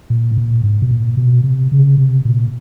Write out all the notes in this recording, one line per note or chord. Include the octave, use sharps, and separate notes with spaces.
A#2
A2
A#2
G#2
B2
A#2
B2
C3
C#3
C3
A#2